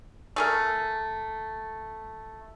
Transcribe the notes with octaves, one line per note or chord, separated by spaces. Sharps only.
A3 G#4 A#4